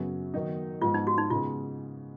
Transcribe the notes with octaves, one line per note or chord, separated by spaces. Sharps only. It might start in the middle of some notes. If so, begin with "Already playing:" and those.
Already playing: F#2 C#3 F#3 B3
D#3 F#3 B3 D#4
G#2 F3 B3 F4
D#4
F#4
D#4
C#3 G#3 B3 F4